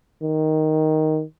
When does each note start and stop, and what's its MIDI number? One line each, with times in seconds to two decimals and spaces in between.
0.23 1.23 51